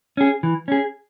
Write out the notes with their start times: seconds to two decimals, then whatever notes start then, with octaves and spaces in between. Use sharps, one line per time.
0.17 C#4 G#4
0.43 E3
0.68 C#4 G#4